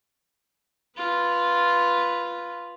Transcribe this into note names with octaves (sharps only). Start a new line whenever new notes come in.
F4 B4